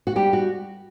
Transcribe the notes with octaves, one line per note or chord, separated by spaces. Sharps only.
F#4
G3 G4
F#4